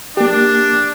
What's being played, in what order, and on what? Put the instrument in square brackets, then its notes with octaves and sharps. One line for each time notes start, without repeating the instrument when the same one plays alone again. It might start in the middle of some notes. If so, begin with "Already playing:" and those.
[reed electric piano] A#3 G4 [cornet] D4